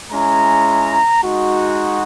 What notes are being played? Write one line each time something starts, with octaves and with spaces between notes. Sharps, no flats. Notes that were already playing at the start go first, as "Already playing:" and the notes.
G#3 C#4 E4 A#5
G#3 D#4 F#4